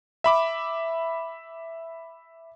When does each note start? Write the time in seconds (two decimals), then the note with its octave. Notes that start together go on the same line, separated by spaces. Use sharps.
0.24 E5 B5 D6